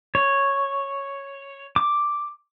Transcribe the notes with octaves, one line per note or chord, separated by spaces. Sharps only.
C#5
D6